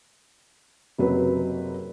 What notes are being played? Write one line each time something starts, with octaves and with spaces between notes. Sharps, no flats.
F#1 C3 F#3 B4